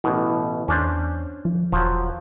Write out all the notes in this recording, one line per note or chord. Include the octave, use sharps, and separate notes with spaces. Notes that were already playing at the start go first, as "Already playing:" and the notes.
A1 B2 E3
E2 C#4 D4 C5
F3
E1 F3 F#3